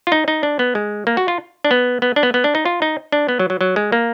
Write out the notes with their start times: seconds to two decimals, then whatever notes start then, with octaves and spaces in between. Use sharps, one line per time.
0.07 F4
0.12 D#4
0.28 D#4
0.43 D4
0.59 B3
0.75 G#3
1.07 A#3
1.17 F#4
1.28 F4
1.65 D4
1.71 B3
2.02 B3
2.16 D4
2.23 B3
2.34 B3
2.44 D4
2.55 D#4
2.65 F4
2.82 D#4
3.12 D4
3.28 B3
3.39 F#3
3.50 F#3
3.61 F#3
3.76 G#3
3.92 A#3